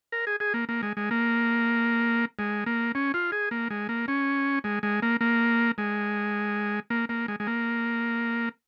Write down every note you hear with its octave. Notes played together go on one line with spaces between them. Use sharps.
A#4
G#4
G#4
A#3
A#3
G#3
G#3
A#3
G#3
A#3
C#4
F4
G#4
A#3
G#3
A#3
C#4
G#3
G#3
A#3
A#3
G#3
A#3
A#3
G#3
G#3
A#3